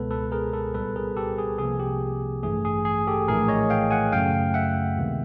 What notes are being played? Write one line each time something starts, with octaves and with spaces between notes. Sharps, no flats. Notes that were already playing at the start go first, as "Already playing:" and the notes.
Already playing: C#2 B2 G#3 B3 A4 B4
A4 B4
G#4 A#4
A4 B4
C2 A#2 G3 B3 A4 B4
G#4 A#4
G4 A4
G#4
C2 C3 F3 A#3 G#4
G4
A1 G2 E3 A3 G#4
G#4
G#4
G4 A4
A#1 A2 E3 A3 G#4 A#4
C#5 D#5
F5 G5
F#5 G#5
F#2 C#3 F#3 A3 F5 G5
E5 F#5
D2 C3 D#3 G#3 B3